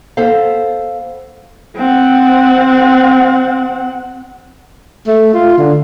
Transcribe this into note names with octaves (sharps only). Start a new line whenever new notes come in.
B3 A4 C5 F5
C4 F#5
A3
F4
D3